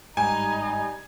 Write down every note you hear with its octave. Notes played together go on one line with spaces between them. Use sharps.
G1 G#2 G3 D#4 G#5